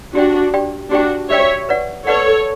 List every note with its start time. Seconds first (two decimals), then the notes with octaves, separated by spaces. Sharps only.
0.14 D4 F#4 G4 D5 G5
0.54 G4 D5 G5
0.91 D4 F#4 G4 D5 G5
1.30 G4 C#5 D5 E5 G5
1.69 B4 D5 F#5
2.07 A4 B4 C#5 D5 F#5